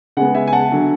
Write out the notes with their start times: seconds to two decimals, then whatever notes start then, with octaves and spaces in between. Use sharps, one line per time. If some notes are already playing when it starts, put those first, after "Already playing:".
0.17 C#3 G#3 B3 F#5
0.35 E5 G#5
0.48 G#5
0.53 F#5 A5
0.72 D3 F#3